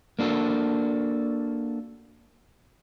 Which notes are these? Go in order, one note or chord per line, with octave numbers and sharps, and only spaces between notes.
A#3 D4 F#4 A4